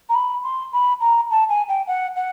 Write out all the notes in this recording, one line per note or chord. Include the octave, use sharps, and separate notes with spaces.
A#5
B5
C6
B5
A#5
A5
G#5
G5
F#5
F#5